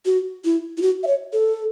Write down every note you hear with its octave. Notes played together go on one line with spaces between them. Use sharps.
F#4
E4
E4
F#4
E5
C#5
A4